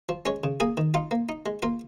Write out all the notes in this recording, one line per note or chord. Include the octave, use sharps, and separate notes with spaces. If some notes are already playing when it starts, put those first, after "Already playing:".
F3
G#3 C#4 C#5
C#3
A#3 G#4 G#5
D#3
D#4 F4 F5
A#3
D#4
G#3
A#3 F4 F5